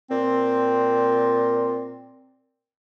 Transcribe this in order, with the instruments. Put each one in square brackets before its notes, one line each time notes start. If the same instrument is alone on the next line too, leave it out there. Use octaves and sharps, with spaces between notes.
[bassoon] A#2 [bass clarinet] C4